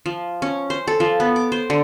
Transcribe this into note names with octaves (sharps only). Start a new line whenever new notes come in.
F3
C#4
C5
A4
F3
B3
D6
C5
D3